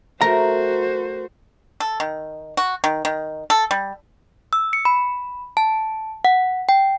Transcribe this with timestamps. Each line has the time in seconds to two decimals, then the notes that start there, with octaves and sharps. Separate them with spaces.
0.21 A3 F#4 A#4 C5 A#5
1.80 A4
2.00 D#3
2.57 F#4
2.84 D#3
3.05 D#3
3.50 A4
3.71 G3
4.53 E6
4.73 C#7
4.85 B5
5.57 A5
6.24 F#5
6.69 G5